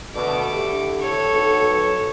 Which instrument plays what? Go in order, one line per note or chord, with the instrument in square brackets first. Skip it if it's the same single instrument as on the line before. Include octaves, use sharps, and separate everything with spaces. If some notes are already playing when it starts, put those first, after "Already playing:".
[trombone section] B2 D3 [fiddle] A3 D6
[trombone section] D3 E4 G4
[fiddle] A4 C#5
[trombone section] B1